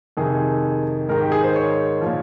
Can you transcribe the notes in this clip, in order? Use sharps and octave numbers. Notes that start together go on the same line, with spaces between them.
F2 C3 D#3 G#4
G#2 D#3 A#4
G4
G#4
C5
C#5
F3
A#2